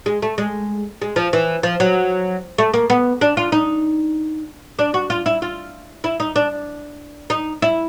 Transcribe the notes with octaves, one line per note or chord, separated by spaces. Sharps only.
G#3
A3
G#3
G#3
F3
E3
F3
F#3
A3
A#3
B3
D4
F4
D#4
D4
F#4
F4
E4
F4
E4
D#4
D4
D#4
E4